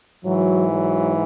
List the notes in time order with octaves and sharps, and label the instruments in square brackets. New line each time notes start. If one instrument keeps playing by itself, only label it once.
[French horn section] G#2 E3 F#3
F#3